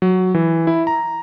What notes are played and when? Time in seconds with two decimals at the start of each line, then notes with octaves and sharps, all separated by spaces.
0.02 F#3
0.34 E3
0.67 E4
0.87 A#5